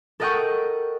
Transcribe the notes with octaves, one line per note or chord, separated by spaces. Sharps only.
A4 A#4 D#5 F#5 G5 C#6